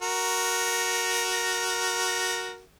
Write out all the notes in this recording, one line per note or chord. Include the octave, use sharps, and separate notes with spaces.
F#4 A#4